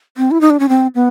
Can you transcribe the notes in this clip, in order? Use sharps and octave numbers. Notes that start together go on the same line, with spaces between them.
C4
E4
D#4
D4
C#4
C4
B3